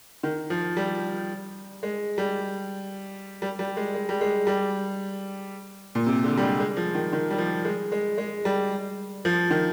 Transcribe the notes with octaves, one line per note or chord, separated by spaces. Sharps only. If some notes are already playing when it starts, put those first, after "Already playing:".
D#3
F3
G3
G#3
G3
G3
G3
G#3
G#3
G3
G#3
G3
A#2
C3
D3
G3
G#3
G#3
F3
D#3
D#3
G3
F3
G#3
G#3
G#3
G3
F3
D#3